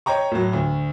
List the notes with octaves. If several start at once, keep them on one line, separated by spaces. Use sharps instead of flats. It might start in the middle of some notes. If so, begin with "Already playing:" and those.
C#5 D#5 G5 A#5 C#6
A2 F#3
D2